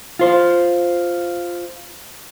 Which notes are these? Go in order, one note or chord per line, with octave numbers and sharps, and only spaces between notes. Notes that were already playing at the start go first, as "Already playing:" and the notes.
F4 C5